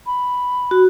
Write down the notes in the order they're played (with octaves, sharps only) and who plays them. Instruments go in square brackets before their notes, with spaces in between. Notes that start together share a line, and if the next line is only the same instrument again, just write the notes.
[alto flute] B5
[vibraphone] F#4